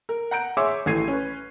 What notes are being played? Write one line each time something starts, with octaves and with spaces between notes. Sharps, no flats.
A#4
F#5 A#5 G6 D7
G#4 C#5 E5 C6 D6 E6
A1 E3 A3 G#6 C7 D#7
C#4 B4